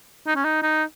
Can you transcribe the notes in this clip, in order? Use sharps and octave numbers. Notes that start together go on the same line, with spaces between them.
D#4
C#4
D#4
D#4